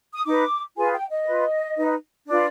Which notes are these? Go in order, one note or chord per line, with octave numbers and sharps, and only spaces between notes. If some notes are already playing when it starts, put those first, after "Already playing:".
D#6
D#4 B4 D6
F4 G#4 B4 G#5
G5
D#5
F4 B4
D#4 B4
D4 F4 B4 D5